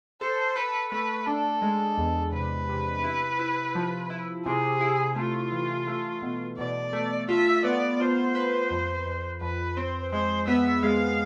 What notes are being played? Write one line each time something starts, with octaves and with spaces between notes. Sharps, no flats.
A4 C5
A4 B4
A3 B4
D4 A4
G#3
E2
C3 B4
C3
E4
E4
F3
E4
C3 G#4
E4
A3 F4
E3
A3
B2
B2 D5
A3
F4 E5
B3 D5
F4 C5
B4
F2
F2
F2 B4
C4 C5
G#3 C5
B3 E5
G#3 F5